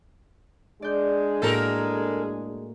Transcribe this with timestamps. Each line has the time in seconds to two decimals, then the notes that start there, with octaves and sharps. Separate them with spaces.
0.82 G#3 D4 G#4 D5 G6
1.42 A2 A#3 F#4 A4 A#4